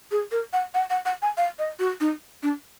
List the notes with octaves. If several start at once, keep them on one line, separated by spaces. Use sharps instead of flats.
G#4
A#4
F#5
F#5
F#5
F#5
G#5
F5
D#5
F#4
D#4
D4